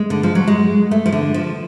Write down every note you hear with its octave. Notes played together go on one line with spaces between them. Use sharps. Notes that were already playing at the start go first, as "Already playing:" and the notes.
Already playing: G#3
D3
F3
F#3
G#3
A3
F3
D3
F3